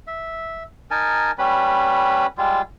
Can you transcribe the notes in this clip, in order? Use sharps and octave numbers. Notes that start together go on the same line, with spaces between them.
E5
D#4 A#4 G#5 A5
G3 C#4 B4 B5
G3 G#3 F4